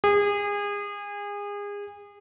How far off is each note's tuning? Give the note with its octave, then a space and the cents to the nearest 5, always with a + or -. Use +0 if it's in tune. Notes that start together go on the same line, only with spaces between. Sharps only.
G#4 -30